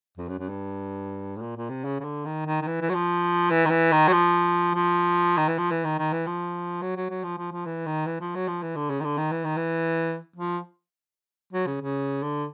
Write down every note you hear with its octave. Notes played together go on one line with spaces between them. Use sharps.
F2
F#2
F#2
G2
A2
A#2
A#2
C3
C#3
C#3
D3
D#3
D#3
D#3
E3
E3
F#3
F3
E3
D#3
E3
D#3
F#3
F3
F3
D#3
E3
F3
E3
D#3
D#3
E3
F3
F#3
F#3
F#3
F3
F3
F3
E3
D#3
E3
F3
F#3
F3
E3
D3
C#3
D#3
D3
D#3
E3
D#3
E3
F3
F#3
C#3
C#3
D3